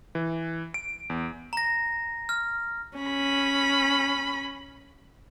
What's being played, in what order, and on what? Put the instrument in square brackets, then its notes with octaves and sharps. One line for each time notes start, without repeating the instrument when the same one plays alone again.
[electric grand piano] E3
D7
E2
[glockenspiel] A#5 A#6
F6
[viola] C#4 B5